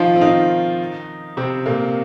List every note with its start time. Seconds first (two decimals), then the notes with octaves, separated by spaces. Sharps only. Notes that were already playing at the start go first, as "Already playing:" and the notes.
Already playing: D#3 F3 D#4 F4
0.16 C4
0.21 D#3 D#4
1.37 C3 C4
1.66 A#2 A#3